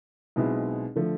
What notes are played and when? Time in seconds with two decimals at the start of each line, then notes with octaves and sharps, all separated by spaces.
0.36 B1 B2 G#3 C4 E4
0.96 D3 F3 A3